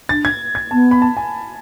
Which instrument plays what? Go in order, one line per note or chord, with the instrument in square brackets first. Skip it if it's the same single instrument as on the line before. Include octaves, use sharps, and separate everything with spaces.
[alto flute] D4 [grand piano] A6
[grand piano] G#6
G#6
[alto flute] B3 [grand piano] A5
[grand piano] B5
A5
G#5